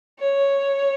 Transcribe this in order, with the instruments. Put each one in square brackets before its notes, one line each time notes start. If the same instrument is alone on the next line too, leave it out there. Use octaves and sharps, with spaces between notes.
[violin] C#5